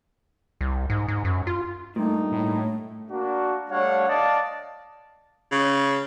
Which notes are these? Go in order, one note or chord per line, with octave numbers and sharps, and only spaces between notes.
C2
G#2
G#2
F#2
F4
G2 A#2 A3 D#4
A2 A3
A#3 D4 F#4
G3 A3 D4 C#5 F5 F#5
D5 D#5 F5 A5
C#3